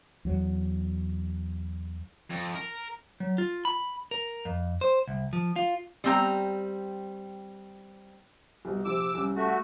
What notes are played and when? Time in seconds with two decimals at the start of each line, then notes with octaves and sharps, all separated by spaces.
0.25 E2 F#3
2.30 F2
2.55 A#4
3.20 F#3
3.38 F4
3.65 B5
4.11 A#4
4.45 F2
4.81 C5
5.08 C2
5.33 F3
5.56 F4
6.04 G3 C4 A#5
8.65 C2 B2
8.85 A#1 C3 D6 E6
9.15 C2 C#4
9.36 A3 F#4